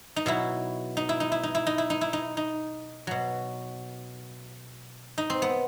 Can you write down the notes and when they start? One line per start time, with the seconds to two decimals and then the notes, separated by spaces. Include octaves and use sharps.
0.16 D#4
0.26 B2 F#3 E4
0.97 D#4
1.09 E4
1.20 D#4
1.32 E4
1.43 D#4
1.55 E4
1.67 D#4
1.78 E4
1.90 D#4
2.01 E4
2.13 D#4
2.37 D#4
3.07 B2 F#3
5.18 D#4
5.30 C4
5.42 B3